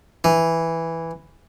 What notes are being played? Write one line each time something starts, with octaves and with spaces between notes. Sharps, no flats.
E3